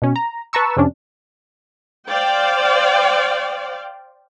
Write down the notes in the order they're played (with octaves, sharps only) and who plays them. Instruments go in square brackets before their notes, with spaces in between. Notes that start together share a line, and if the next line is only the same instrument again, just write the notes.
[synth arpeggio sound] B2 C#4
A#5
B4 A5 A#5 C#6 E6
F2 C3 C#4 D4
[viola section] C5 D5 F5 G5